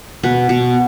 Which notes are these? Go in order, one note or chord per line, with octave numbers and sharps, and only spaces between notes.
B2 B4
B2